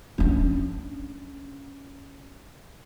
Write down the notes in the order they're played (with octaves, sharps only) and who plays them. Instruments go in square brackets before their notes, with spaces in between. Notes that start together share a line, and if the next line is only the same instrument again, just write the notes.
[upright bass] C#4 D4